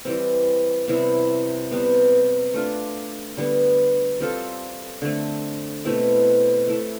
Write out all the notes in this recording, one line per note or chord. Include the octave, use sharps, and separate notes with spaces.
E3 G3 C4
C3 G3 B3 E4
C3 G3 B3
A3 D4 F4
D3 G3 B3
G3 C4 F4 A4
D3 A3 C4
B2 A3 C4 E4
A3 E4 A4